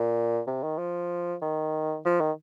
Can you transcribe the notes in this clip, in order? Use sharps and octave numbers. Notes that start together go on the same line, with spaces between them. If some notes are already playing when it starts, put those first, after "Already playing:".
Already playing: A#2
C3
D#3
F3
D#3
F3
D#3